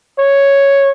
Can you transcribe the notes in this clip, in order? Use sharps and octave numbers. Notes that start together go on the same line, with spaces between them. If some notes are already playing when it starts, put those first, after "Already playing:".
C#5